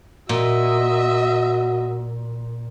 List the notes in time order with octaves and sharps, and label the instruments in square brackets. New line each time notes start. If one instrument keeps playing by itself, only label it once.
[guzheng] A#2 [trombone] F#4 [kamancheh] D#5 E5